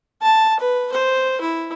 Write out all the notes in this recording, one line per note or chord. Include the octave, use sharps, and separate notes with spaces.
A5
B4
C5
E4